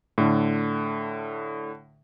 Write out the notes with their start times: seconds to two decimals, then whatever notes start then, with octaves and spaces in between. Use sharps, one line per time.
0.18 A2 D3